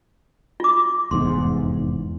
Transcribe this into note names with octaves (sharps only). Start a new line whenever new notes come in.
F4 D6
F1 E2 G#2 C6